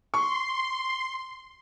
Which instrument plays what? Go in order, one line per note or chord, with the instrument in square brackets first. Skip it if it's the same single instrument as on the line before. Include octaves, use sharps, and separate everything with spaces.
[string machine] C6 [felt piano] C#6